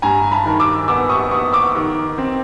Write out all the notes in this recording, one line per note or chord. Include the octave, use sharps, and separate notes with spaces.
G2 G#5 A#5
A5 B5
D#3
D6 E6
B3 D6 E6
C#6 D#6
B3 C#6 D#6
D6 E6
D#3
C4